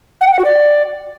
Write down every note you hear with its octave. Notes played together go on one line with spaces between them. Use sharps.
F#5
G5
F#5
F#4
D5